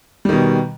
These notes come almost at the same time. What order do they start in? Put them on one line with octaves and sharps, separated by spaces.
G3 D#3 B2